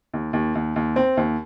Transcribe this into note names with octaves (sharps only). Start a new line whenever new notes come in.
D#2
D#2
D#2
D#2
C4
D#2